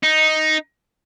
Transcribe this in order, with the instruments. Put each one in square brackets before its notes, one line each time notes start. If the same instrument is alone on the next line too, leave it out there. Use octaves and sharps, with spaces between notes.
[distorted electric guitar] D#4